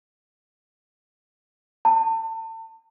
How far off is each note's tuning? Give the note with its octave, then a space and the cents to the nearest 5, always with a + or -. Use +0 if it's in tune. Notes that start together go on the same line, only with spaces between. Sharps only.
A5 +35